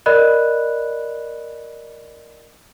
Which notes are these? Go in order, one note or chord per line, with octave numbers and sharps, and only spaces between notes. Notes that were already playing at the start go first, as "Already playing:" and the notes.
A#4 D5 D#5 B5 F#6